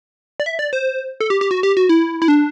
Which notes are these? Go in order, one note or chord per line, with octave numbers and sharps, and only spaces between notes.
D5
E5
D5
C5
A4
G4
G4
F#4
G4
F#4
E4
E4
D4